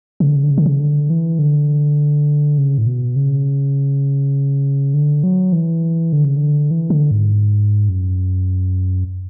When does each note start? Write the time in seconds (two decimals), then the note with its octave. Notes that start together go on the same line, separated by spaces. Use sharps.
0.20 C#3
0.28 D3
0.35 C#3
0.43 D3
0.51 C#3
0.58 D3
0.66 C#3
0.80 D3
1.10 E3
1.39 D3
2.58 C#3
2.78 A2
2.87 B2
3.16 C#3
4.94 D3
5.23 F#3
5.53 E3
6.13 D3
6.25 C#3
6.36 D3
6.71 E3
6.90 D3
7.11 G#2
7.89 F#2